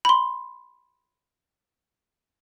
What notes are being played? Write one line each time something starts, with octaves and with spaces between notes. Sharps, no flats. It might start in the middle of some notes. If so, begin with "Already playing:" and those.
B5 C6